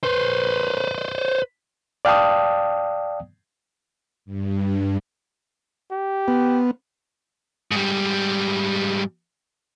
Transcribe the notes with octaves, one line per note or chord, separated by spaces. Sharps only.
B4 C5
D5 F5 G5 A5 D#6
G2
G4
B3
G#2 G3